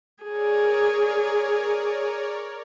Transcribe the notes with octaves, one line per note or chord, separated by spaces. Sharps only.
G#4 A#4 C#5 D5